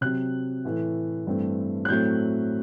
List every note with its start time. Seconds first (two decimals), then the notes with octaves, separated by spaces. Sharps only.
0.01 C3 F#3 C4 F#6
0.65 A2 E3 A3
1.27 G2 E3 A3 C4
1.85 F#6
1.89 A2 F#3 A3 C4 G6